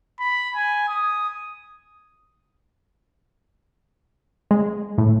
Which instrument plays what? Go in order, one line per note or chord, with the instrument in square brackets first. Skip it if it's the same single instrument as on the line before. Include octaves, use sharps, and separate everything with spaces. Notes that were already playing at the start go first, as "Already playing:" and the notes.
[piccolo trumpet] B5
G#5
D#6
[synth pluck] G#3
A2